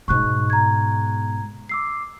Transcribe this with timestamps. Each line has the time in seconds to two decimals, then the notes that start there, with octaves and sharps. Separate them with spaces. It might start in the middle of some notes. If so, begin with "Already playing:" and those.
0.08 G#2 B2 C#6 F#6
0.50 A#5 G#6
1.69 D6 E6 C7